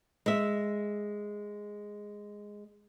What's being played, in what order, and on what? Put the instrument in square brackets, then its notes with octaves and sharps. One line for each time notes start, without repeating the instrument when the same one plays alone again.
[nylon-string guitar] G#3 E5